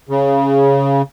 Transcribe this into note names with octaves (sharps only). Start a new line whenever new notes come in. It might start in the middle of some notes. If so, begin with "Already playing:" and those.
C#3